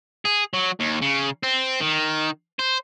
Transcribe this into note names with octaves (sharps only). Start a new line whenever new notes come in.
G#4
F#3
D#2
C#3
C4
D#3
C5